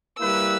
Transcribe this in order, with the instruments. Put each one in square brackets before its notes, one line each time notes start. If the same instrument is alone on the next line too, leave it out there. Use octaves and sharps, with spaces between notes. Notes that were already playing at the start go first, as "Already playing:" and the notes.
[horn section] G3 A#3 E4 B4 [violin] E6